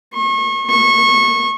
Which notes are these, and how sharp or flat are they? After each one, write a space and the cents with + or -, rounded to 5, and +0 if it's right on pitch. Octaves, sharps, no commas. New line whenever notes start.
C#6 -35
C#6 -25